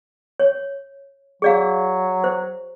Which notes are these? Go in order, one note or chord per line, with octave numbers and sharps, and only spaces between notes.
C#5
F#3 G#4 D5 F5
C5